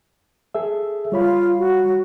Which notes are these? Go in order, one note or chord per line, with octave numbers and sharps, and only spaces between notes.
G#4 A4 E5
G3 F4 C#5 B5
F#4